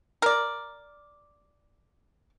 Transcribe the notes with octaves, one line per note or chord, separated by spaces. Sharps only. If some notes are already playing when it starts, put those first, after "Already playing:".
A#4 D5